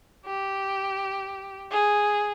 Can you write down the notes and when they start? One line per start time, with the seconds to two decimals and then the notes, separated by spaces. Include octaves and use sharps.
0.26 G4
1.71 G#4